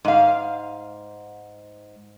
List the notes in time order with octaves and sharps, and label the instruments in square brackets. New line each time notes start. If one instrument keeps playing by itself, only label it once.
[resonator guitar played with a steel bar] G#2 F5